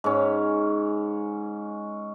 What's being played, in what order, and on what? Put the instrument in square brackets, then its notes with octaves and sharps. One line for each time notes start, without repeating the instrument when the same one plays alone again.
[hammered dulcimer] G#2 C#4